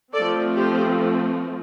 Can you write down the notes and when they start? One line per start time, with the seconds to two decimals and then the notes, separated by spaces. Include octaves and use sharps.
0.13 F3 A3 C4 A4 D5
0.53 G4 C5